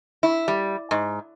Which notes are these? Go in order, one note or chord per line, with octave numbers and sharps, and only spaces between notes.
E4
G3
G#2